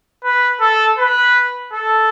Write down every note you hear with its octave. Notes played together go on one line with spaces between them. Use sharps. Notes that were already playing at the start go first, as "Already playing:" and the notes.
B4
A4
B4
A4